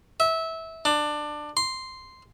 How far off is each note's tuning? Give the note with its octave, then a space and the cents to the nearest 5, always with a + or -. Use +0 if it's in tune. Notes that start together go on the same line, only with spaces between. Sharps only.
E5 -20
D4 +20
C6 -5